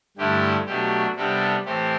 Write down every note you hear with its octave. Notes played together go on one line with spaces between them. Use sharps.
G2 D3 A3 E4 G4
B2 F#3 A3 D4 G4
C3 G3 B3 D4 A4
A2 E3 A3 C4 G4